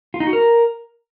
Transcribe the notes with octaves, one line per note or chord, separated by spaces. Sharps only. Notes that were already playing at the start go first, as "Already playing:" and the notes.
F4
D#4
F#4
A#4